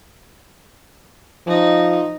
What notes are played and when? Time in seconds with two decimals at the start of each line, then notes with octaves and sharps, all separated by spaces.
1.47 F3 D#4